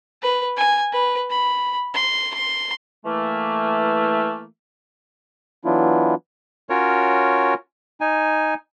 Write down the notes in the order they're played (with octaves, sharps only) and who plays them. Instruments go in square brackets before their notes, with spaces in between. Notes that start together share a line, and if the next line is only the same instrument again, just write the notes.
[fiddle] B4
G#5
B4
B5
C6
C6
[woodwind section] E3 A3 A#3
[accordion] E3 F#3 B3 D4 E4 F4
[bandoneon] C#4 F4 F#4 A#4 C#5
D#4 G#5